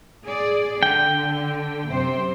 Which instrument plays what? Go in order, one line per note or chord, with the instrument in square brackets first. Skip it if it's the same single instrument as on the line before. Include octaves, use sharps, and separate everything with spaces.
[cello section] G#4 D5
[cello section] D3 [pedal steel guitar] G5
[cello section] F#2 C3 C5